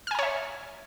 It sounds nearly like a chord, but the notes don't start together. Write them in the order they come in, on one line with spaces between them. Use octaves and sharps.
F6 G#5 A#5 C#5 E5